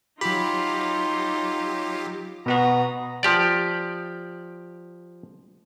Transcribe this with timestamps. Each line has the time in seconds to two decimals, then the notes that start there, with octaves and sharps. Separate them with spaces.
0.21 F#3 D#4 F4 G4 B5
2.46 B2 B3 F#4 A#5 D#6
3.23 F3 G4 D5